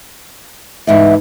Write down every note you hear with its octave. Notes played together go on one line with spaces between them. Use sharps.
E2 G#2 E3 E5